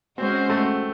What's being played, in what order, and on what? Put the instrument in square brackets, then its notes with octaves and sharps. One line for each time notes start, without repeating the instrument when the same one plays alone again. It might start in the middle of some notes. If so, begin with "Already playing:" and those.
[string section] G#3 C#4 F#4 C5 [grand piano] C4
[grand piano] A3